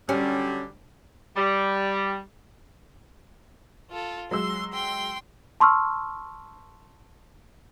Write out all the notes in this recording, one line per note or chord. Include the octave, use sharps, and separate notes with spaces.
D3 F#3 G3 C#4
G3
F4 A4
F#3 G#3 C6 E6
G5 C6
A5 C6 C#6 E6 F6